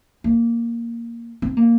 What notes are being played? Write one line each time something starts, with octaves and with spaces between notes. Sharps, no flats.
A#3
C4
A#3